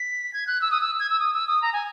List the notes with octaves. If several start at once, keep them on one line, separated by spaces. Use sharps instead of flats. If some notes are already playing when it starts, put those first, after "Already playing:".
Already playing: B6
G#6
F#6
E6
D#6
E6
G#6
E6
D#6
E6
D#6
A#5
G#5